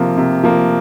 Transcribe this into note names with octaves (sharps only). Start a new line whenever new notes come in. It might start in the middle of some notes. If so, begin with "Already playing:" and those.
Already playing: C3 F3 A#3
C3
F3 A#3